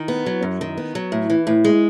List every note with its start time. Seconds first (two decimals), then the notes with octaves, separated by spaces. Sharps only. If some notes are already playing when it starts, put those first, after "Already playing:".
Already playing: D#3
0.08 B3
0.26 F#3
0.43 F#2
0.61 D#3
0.77 B3
0.95 F#3
1.12 A2
1.30 E3
1.47 A2
1.64 G#3